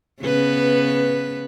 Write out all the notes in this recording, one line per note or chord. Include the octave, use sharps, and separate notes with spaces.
C#3 B3 B4